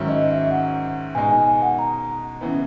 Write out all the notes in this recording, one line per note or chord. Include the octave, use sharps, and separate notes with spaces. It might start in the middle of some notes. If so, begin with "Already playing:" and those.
Already playing: G#2 D#3 F#3 C#4 E4
D#5
E5
F#5
B2 G#3 D#4 G#5
G#5
G#5
F#5
A#5
C#3 E3 B3